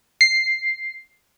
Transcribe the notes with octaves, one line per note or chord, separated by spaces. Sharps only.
C7